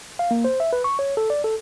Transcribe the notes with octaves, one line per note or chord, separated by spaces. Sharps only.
F5
A#3
C5
E5
B4
C#6
C#5
A4
D5
A4